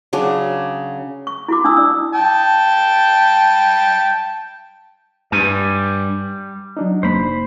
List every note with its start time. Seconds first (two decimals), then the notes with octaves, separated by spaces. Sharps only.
0.13 C#3 F#3 D4 G#4
1.27 C#6
1.48 E4 F#4 D6
1.64 D4 A5 D#6 E6
1.77 D5 E6
2.14 G5 A5
5.32 G2 G3 G#5
6.77 F#3 D4 D#4
7.03 F1 A#3 C5 B5